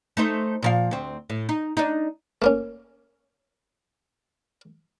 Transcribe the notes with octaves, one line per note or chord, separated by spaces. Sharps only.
A3 D#4 C5
A#2 F3 F5
D2 C4
A2
D#4
D4 D#4
A3 A#3 C#4